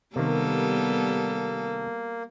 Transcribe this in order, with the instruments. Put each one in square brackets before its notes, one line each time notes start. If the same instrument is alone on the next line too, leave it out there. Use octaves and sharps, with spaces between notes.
[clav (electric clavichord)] C3 D#3 [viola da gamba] G3 B3 A4 [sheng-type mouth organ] A#3